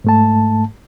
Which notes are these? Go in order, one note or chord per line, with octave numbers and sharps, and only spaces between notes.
G#2 A3 A5